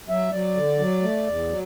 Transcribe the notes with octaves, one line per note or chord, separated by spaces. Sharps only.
F#3 E5
F#3 D5
D3
F#3
A3
E2
F#3